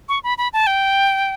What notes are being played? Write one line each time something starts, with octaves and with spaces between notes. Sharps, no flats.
C#6
B5
B5
A5
G5